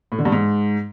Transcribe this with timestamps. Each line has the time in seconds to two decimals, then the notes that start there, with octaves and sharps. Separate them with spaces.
0.12 A2
0.19 D3
0.25 G2
0.32 G#2